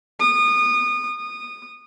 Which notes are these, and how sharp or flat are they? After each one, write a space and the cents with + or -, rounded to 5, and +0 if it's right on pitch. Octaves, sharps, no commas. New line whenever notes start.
D#6 -25
D#6 -20